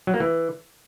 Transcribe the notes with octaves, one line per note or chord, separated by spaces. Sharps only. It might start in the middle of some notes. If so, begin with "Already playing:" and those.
F#3
A#3
E3